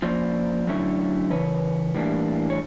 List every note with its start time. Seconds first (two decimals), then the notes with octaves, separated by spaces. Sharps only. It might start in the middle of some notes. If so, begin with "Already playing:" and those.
0.02 F3 A#3 C#4 F4 C5 D5
0.67 D3 F#3 A3 C#4 E4
1.30 C#3 E3 B4 C#5
1.94 A2 E3 G3 A#3 D4
2.50 C#5